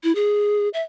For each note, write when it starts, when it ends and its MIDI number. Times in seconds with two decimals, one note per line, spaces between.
0.04 0.14 64
0.15 0.69 68
0.74 0.82 76